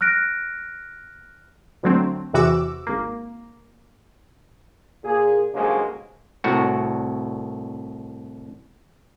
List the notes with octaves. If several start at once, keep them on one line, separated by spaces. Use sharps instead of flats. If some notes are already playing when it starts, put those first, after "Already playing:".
F6 F#6 A#6 D7
D2 D3 F#3 A3 C4
E2 C3 E3 F#4 D6 E6
G#1 A#3
A#2 G#4
B1 G2 C#3 G#3 A#3 C5
C2 A2 F#4